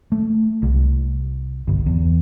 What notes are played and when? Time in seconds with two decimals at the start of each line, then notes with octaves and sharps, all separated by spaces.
0.12 A3
0.63 C2
1.67 G1
1.86 E2